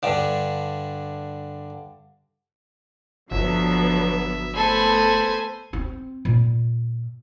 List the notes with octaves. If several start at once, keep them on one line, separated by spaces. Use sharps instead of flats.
G2 D3
G1 D3 F3 F#3 B3 E5
A3 B3 A4 C5 G#5 B5
C4
A#2